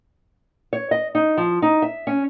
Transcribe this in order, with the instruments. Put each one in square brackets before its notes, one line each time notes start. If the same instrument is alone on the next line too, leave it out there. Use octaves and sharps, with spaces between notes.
[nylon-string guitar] C#5
D#5
D#4
F3
D#4
E5
C#4